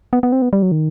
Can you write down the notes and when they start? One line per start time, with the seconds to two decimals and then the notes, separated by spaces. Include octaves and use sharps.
0.13 B3
0.23 B3
0.32 C4
0.42 B3
0.53 G3
0.62 F#3
0.72 D#3